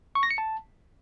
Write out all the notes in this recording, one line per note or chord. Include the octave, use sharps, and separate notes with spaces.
C#6
A#6
C#7
A5